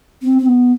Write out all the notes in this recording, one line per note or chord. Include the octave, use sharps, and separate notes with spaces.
C4
C4
B3